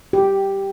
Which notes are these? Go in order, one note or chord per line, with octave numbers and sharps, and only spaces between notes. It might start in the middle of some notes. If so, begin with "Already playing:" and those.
G4